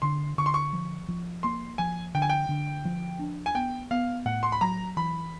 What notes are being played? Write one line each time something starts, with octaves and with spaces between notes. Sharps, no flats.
D3 C6
D3 C#6
C6
C#6
F3
F3
A#3 C6
F3 G#5
D3 G5
G#5
G5
D3
F3
D4
G#5
B3 G5
B3 F5
A2 F#5
C6
B5
F#3 A#5
E3 B5